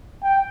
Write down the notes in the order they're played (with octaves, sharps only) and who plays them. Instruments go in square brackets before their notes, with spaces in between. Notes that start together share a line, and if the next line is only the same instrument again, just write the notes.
[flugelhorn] G5